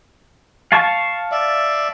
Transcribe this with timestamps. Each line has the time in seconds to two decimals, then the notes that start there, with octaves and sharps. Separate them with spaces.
0.72 F5 A5 C#6
1.31 D5 E5